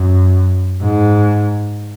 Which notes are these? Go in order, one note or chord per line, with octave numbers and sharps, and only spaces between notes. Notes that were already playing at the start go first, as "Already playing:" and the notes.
Already playing: F#2
G#2